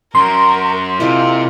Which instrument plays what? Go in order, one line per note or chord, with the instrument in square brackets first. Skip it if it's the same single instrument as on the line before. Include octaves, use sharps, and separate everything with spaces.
[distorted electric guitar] F#2 [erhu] A#4 [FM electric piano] C6
[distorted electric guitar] C3 [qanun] G#3 A#3 E4 [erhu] F4